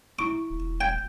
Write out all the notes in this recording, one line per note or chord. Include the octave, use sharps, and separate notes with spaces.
E4 C#6 D6
E1
G5 G6 G#6